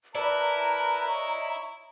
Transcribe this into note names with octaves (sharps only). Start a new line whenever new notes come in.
E4 A#4 B4 D5 A5 A#5
C#5 D#5